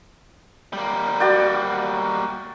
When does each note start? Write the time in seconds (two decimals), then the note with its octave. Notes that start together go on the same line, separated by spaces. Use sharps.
0.73 G3 A#3
1.20 F#4 D5 G5